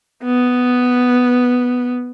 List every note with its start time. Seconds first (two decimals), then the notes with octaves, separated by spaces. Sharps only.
0.24 B3